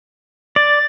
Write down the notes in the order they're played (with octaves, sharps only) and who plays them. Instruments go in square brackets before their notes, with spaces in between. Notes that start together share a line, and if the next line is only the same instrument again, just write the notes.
[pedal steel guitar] D5 [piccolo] A6